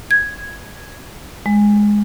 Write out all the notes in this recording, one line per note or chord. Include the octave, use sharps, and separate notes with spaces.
G#6
G#3